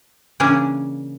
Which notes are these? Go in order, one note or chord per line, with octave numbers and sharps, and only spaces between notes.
C#3 E3 A#3 C#4 D4